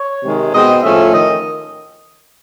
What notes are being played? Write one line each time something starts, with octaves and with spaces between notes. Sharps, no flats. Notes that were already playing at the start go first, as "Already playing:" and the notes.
Already playing: C#5
C3 D#3 G#3
B2 G#3 C4 D#5
A2 F3 A3 C#4 E5
D#3 D#5